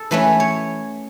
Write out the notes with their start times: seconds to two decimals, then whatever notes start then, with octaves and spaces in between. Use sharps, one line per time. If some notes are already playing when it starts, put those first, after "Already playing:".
Already playing: A4
0.11 E3 A3 C#4 B4
0.40 C#5